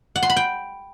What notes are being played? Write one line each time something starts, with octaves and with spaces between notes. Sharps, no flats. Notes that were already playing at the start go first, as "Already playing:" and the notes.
F#5
C6
B5
G5